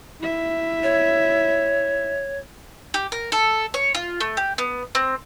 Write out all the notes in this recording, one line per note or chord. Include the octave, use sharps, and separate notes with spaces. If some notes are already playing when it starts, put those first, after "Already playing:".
E4 E5
C#5
G4
A#4
A4
C#5
F4
A3
G4
B3
C4